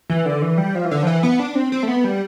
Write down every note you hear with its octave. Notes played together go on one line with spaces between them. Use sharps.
E3
D3
E3
G3
F3
E3
D3
F3
E3
B3
D4
C4
C4
A3
B3
G3